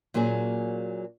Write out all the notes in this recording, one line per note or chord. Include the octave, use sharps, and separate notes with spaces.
A#2 F#3 A#3 C#4 G#4